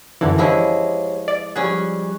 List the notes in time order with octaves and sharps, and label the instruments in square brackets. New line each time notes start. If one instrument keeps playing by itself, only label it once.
[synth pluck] F#2 D3 E3
[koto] F3 G#3 E4 [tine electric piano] G4 C#5
[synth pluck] D5
[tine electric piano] F3 G3 F#6 [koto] C#4 G#4